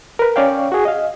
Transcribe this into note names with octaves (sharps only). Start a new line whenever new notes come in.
A#4 B4
C#4 C#5 D5 F5 G5
F#4 G#4
D#5 F5